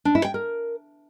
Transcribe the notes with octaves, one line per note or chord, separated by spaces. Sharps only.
D4
E4
G5
A#4